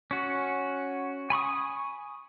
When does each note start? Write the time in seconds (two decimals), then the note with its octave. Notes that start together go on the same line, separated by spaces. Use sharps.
0.11 C#4 F#4
1.30 G#5 B5 C#6 D#6